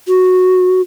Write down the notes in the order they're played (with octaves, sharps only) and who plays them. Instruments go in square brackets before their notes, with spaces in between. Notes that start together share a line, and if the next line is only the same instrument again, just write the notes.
[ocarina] F#4